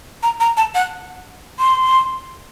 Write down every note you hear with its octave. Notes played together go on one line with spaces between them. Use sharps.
A#5
A#5
A5
F#5
C6